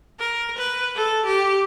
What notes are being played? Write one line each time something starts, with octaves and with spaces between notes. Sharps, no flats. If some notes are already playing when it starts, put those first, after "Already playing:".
A#4
B4
A4
G4